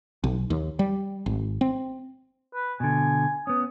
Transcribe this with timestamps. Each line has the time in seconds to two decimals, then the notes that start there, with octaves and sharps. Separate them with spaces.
0.24 B1
0.50 D#2
0.79 G3
1.26 G#1
1.61 C4
2.54 B4
2.80 B2 D3 G#5
3.47 B3 C#4 D#6